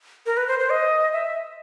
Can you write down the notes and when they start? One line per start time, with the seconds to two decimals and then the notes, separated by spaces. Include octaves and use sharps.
0.26 A#4
0.37 B4
0.48 C5
0.59 C5
0.70 D#5
1.13 E5